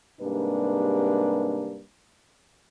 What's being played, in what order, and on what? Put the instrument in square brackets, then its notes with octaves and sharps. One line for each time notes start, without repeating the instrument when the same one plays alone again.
[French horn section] G#2 C3 G3 A#3 D4 B4